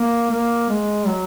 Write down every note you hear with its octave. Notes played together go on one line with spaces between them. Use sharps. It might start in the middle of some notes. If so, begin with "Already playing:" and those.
Already playing: A#3
A#3
G#3
F#3